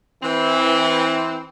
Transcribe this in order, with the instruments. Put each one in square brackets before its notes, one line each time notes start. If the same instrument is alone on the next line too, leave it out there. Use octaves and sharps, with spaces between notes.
[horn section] E3 C4